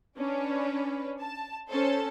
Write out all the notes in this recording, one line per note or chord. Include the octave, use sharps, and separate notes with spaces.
C#4 D4 B4
A5
C#4 A4 C5